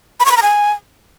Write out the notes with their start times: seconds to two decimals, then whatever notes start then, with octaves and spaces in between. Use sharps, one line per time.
0.20 B5
0.25 C#6
0.31 B5
0.37 A#5
0.42 G#5